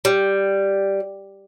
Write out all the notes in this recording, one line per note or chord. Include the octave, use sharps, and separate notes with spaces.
G3